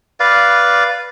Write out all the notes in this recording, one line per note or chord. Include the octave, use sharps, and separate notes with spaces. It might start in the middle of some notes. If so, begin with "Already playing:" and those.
B4 D5 F5